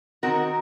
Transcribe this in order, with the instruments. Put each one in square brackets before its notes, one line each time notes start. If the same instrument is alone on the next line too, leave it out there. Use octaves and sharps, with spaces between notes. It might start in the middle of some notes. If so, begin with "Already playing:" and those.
[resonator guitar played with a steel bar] D#3 F#3 C4 D#4 F#4 A#4